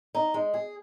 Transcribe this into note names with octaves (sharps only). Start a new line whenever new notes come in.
D#4
G#3
G#4